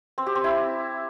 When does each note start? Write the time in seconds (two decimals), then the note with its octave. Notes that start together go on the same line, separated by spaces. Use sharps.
0.18 C4
0.26 G4
0.35 C4
0.44 E4